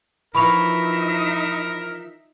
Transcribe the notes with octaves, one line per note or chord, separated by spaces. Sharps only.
E3 F3 D#4 A#4 E5 B5 C#6 F7